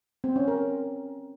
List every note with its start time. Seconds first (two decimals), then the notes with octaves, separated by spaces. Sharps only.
0.24 C4
0.36 C#4
0.48 A#4